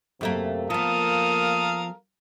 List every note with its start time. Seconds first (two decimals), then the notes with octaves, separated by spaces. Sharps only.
0.21 F#2 C3 A3 A#3
0.70 F3 A#3 B3 A4 A#4 F5 D#6